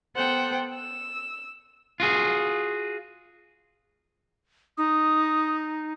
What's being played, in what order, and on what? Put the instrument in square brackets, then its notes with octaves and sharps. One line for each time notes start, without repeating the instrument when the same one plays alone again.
[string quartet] B3 A4 C5 F#5 G5
E6
[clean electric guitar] F4 F#4 G#4
[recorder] D#4 [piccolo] D#6